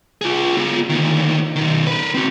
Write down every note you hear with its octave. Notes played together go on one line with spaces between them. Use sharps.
F4 G#4
B3 F4
D2 D#3
B2 D#3
A#4 B4
C4 F#4